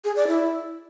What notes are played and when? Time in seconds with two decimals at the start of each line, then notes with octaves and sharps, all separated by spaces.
0.04 G#4
0.16 D5
0.27 E4